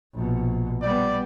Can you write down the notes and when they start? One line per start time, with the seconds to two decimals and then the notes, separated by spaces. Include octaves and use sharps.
0.14 A#1 B2
0.82 G3 B3 D5